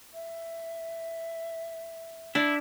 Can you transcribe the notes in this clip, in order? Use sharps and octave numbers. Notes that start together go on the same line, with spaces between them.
E5
D4 E4